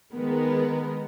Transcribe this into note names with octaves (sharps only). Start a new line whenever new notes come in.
D#3 G#3 B3 A#4 B4